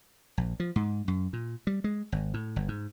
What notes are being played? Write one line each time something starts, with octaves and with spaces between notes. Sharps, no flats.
A#1
F3
G#2
F#2
A#2
G3
G#3
G#1
A2
G1
G#2